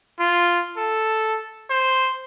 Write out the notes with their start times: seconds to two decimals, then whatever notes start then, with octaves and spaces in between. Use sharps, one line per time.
0.19 F4
0.77 A4
1.70 C5